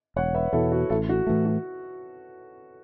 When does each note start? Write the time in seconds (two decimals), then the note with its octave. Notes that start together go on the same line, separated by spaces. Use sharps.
0.16 E1 C#5 F#5
0.34 B4 E5
0.53 E2 B2 E4 A4
0.72 F#4
0.90 A1 E4 A4
1.09 F#4
1.27 A2 E3 A3
1.46 F#4